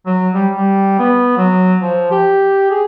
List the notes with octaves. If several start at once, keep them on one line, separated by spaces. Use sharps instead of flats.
F#3
G3
G3
B3
F#3
F3
G4
G#4